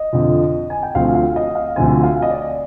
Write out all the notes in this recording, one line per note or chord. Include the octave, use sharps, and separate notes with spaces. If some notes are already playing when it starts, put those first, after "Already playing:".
Already playing: D#5
F2 D3 F3
G#5
G5
D2 D3 F3 C4 F5
F5
D#5
F5
D2 D3 F3 C4 G#5
F5
D#5
D5